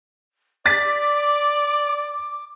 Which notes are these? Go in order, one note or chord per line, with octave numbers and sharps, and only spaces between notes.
D5 D6 A6 B6